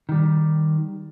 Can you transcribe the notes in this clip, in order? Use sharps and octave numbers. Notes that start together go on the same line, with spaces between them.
D#3 G3